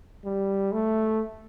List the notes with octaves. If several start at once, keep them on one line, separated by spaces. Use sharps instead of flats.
G3
A3